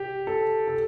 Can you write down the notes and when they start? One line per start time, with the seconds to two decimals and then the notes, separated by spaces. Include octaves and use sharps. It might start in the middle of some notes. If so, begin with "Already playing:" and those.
Already playing: G4
0.27 A4
0.68 A4